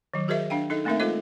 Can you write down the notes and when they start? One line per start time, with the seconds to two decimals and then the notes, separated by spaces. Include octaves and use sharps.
0.14 D#3 F#3
0.28 F#4 G#4 A#4 C5 D#5 E5
0.50 D4 F5 G5
0.70 D#4 A4 D#5
0.85 A3 A#3 C4 D#4 A#4 E5
1.00 G#3 F4 A4 C5 D#5